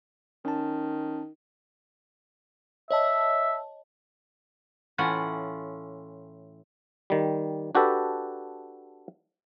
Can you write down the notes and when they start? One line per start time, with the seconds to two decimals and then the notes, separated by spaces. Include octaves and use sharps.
0.45 D#3 C#4 A5
2.91 C#5 D#5 E5 A5
4.98 A2 E3 C#4 F4 F#5
7.10 D#3 G3
7.75 D4 F#4 G4 A4 B4